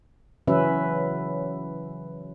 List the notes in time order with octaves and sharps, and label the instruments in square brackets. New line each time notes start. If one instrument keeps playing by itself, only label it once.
[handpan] C#3 E3 F#3 C#4 B4 E5